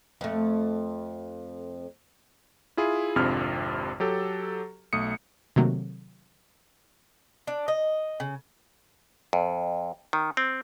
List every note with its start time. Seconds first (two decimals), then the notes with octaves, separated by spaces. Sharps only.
0.21 F2 A3
2.77 E4 F4 G#4
3.16 G#1 F2 C3 D4 F4 F6
4.00 F#3 G4 A4
4.93 B1 A3 D#6 C#7
5.56 C3 D#3 F#3 A3 A#3
7.47 D4
7.68 D#5
8.20 C#3
9.33 F2
10.13 D#3
10.37 C4